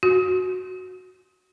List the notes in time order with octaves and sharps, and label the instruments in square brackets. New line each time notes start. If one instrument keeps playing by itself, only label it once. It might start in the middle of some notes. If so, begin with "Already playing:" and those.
[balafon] F#4